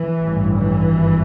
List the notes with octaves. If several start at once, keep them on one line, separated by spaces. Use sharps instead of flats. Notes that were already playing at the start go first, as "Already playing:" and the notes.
Already playing: E3
A1 G2
E3
G#1 G2